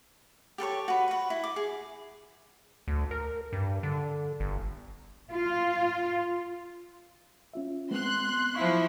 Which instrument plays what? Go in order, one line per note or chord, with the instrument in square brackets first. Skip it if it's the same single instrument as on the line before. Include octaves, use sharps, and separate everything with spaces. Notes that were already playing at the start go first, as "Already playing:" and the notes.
[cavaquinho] G4 A4 B4 C#5
F#4 B4
F#4 B4
E4
D6
G#4
[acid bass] D2
A#4
G2
D3
G1
[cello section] F4
[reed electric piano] C#4 F4 E5
[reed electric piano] G#3 B3 C4 [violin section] C6 F#6
[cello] F3 E4 [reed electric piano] F5 C#6